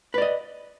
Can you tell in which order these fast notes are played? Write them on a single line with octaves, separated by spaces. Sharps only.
B4 D5 D#5